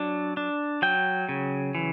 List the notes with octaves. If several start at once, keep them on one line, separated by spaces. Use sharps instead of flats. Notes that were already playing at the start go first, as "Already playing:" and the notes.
Already playing: F#3 D4
D4
F#3 G5
C#3
E3